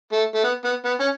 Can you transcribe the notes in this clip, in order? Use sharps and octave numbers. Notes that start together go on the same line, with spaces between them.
A3
A3
B3
B3
B3
C#4